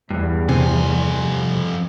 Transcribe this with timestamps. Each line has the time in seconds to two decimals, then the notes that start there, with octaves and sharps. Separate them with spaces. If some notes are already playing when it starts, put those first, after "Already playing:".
0.11 E2 G2
0.49 F2 C3 G#5